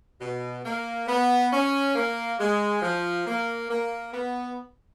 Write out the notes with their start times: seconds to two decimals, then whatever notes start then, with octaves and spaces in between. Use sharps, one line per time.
0.20 B2
0.64 A#3
1.07 B3
1.51 C#4
1.95 A#3
2.38 G#3
2.82 F3
3.25 A#3
3.69 A#3
4.12 B3